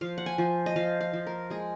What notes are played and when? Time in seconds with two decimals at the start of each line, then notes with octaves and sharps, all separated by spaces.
0.01 F3 F5
0.18 F#5
0.26 G#5
0.38 F3
0.66 D#5
0.76 F3 F5
1.01 F5
1.13 F3
1.26 A#4
1.50 G#3 G#4